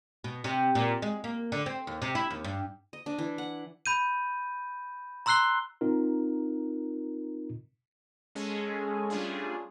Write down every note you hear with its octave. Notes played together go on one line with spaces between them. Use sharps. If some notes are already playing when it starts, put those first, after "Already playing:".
B2
C3
A#2
G#3
A#3
D3
C4
D#2
C3
E4
D#2
G2
D#5
D4
E3
F#5
B5 G6 D#7
A#5 C6 E6 F#6 C7 G7
C4 D#4 F4 A#4
G#3 C#4 G#4 A4
G3 A3 C#4 D4 F4 G#4